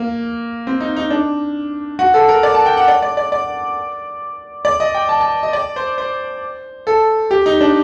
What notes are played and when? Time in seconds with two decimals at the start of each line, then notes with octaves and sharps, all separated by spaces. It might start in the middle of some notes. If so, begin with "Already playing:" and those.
Already playing: A#3
0.67 C4
0.80 D#4
0.96 D#4
1.10 D4
1.99 F#4
2.14 A4
2.29 A#4
2.43 D5
2.54 A5
2.66 G5
2.77 F#5
2.88 D5
3.02 D5
3.17 D5
3.32 D5
4.65 D5
4.80 D#5
4.94 G5
5.09 A5
5.21 A5
5.43 D#5
5.53 D5
5.76 C5
5.98 C5
6.87 A4
7.31 G4
7.46 D#4
7.61 D4